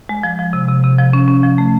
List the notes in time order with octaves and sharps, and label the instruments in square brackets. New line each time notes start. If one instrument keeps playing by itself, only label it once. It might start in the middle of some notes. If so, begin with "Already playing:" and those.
[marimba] G#3
F3
F3
C3
C3
C3
F3
C#4
C#4
F3
A3